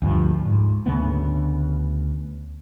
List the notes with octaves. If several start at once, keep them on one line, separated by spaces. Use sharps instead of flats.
D2 G2 F3
G#2
D2 C#3 A3 B3